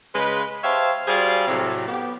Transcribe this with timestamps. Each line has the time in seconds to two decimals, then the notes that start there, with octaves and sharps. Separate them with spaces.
0.14 C#3 G#3 B4
0.64 G4 C5 C#5 E5 F5 A5
1.08 G3 F#4 G#4 C5 D5 F5
1.47 A2 C3 F#3
1.88 B3 G4